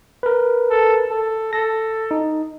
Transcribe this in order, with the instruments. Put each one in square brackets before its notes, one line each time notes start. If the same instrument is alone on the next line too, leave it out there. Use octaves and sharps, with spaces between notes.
[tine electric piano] A#4 B4
[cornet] A4
A4
[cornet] A4 [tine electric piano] A#6
[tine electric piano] D#4